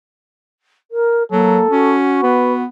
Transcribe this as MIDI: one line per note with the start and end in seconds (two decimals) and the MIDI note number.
0.91 1.23 70
1.32 1.60 54
1.32 1.67 58
1.32 1.97 69
1.71 2.21 61
1.71 2.62 66
2.23 2.66 59
2.23 2.54 71